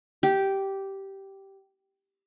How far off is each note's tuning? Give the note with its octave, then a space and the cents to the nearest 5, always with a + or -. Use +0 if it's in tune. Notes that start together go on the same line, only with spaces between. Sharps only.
G4 -10